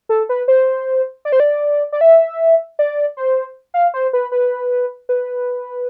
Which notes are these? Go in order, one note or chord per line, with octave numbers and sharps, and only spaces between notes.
A4
B4
C5
D5
C5
D5
D5
E5
D5
C5
F5
C5
B4
B4
B4